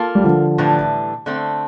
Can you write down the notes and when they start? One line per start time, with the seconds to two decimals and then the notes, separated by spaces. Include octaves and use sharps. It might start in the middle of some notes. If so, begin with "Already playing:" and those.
Already playing: A#3 F4 A4
0.15 G3
0.24 D3 F3
0.58 A2 E3 G3 D4
1.26 D3 A3 C4